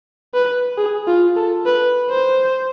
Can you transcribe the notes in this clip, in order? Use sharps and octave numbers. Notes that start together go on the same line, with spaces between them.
B4
G#4
F4
A4
B4
C5